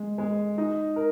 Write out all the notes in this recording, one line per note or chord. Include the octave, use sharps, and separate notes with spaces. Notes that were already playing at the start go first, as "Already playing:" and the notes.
Already playing: G#3
G#3
D#4
A#4